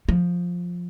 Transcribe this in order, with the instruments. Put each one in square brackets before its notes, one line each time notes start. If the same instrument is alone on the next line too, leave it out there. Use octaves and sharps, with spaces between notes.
[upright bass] F3